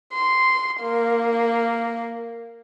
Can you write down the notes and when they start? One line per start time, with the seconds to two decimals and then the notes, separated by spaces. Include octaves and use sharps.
0.14 C6
0.82 A#3